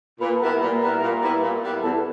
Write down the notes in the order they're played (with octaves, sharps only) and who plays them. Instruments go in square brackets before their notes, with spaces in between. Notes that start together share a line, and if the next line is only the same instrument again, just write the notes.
[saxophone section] A#2 [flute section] B4 B5
[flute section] A5
[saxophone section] G3 B3 E4 [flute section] A#4 A#5
[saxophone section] A#2 [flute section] B4 B5
[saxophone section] G3 B3 E4 [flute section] A#4 A#5
[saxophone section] A#2
G3 B3 E4
A#2
G3 B3 E4
[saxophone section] E2 [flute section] A4 A5